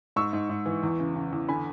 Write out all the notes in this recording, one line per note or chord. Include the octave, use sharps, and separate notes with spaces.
G#2 C#6 E6
G#2
G#2
E3
E2
C#3
C#3
E2
D3 G#5 B5